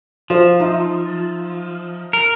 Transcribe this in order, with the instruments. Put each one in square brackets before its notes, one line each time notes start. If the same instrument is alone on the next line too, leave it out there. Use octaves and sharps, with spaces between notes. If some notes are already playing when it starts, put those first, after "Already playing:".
[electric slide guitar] F3 [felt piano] F4 C5
[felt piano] D#4 E5
[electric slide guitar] A#4